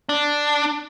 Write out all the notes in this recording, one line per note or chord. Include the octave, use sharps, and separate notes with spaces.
D4